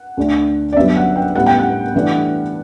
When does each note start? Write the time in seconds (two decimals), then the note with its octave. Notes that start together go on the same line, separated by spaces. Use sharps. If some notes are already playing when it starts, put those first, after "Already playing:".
Already playing: F#5
0.17 D2 D3 A3 D4
0.73 D5
0.76 G1 G2 F#3 E5
0.97 F#5
1.16 G5
1.35 A2 G3 B3 F#5
1.46 G5
1.59 F#5
1.95 G2 E3 A3 D4